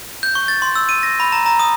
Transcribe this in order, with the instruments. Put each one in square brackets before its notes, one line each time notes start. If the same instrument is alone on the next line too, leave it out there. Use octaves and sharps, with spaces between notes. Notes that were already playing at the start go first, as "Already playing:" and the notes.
[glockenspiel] G6
C#6
A6
C6
E6
D#7
A#6
B5
A#5
A#5
D#6